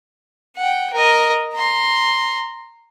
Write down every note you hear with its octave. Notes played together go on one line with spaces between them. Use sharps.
F#5 G5
A#4 D#5
A#5 C6